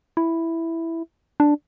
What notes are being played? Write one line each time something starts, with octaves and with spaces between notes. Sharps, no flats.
E4
D4